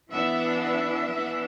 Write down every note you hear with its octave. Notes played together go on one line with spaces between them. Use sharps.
E3 B3 D4 E5
E5
E3 B3 D4